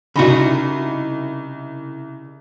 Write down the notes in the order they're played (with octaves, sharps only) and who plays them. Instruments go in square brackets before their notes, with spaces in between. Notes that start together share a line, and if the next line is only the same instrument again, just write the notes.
[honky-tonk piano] C2 B5 [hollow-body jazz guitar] C#3 D#4 F#4